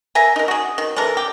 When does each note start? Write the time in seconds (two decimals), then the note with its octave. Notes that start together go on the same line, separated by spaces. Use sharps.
0.15 A#4 E5 G#5 A#5
0.36 D#4 A#4
0.48 F#4 G#4
0.78 D#3
0.96 C3 E3 A4 A#4
1.17 G4